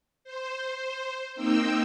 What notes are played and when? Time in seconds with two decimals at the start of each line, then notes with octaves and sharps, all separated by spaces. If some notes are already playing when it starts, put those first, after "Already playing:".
0.24 C5
1.36 A#3 C4 D#4 G5 E6